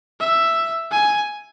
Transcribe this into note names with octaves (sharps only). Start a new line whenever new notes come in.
E5
G#5